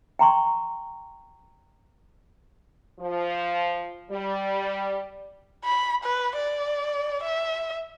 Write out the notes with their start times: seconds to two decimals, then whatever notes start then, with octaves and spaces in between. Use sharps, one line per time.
0.19 G5 A#5 C6 C#6
2.99 F3
4.11 G3
5.65 B5
6.04 B4
6.36 D5
7.23 E5